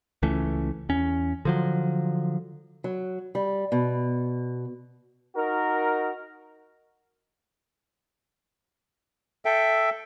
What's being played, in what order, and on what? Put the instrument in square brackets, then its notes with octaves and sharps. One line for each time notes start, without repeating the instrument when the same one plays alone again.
[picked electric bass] C#2 E3 A3 C#4
E2 C#4
D3 F3 F#3
[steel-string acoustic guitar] F#3
G3
B2
[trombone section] D#4 F#4 A#4
[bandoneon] A4 E5 G5